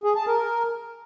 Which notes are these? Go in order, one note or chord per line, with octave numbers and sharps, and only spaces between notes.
G#4
A5
A#4